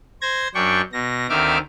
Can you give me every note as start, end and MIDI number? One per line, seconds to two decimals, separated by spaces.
0.22 0.48 72
0.22 0.48 92
0.22 0.48 94
0.54 0.81 42
0.54 0.81 62
0.54 0.81 79
0.54 0.81 85
0.92 1.27 47
0.92 1.27 94
1.29 1.58 38
1.29 1.58 51
1.29 1.58 60
1.29 1.58 76
1.29 1.58 86
1.29 1.58 89